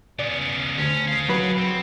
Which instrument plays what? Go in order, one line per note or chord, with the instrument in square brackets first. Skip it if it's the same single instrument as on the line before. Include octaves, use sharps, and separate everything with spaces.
[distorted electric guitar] C#3 B3 [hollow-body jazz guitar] D5
[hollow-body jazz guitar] D2 [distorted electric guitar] C#4
[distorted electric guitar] G#4 F5
[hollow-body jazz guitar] F#3 B4
[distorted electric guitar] C4